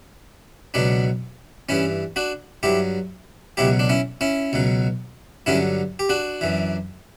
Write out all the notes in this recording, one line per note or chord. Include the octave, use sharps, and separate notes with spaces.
C#2 B2 F#3 B3 D4
G2 E3 C#4 E4
D4 F#4
G2 F#3 E4 G4
C#2 B2 F#3 E4 G4
D4
C#4 E4
C#4 E4
C#2 B2 F#3
G2 D3 F#3 C#4 E4
G4
D4 F#4
F#2 E3